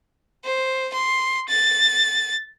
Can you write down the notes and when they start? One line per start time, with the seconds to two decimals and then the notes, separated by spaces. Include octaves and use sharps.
0.45 C5
0.94 C6
1.49 A6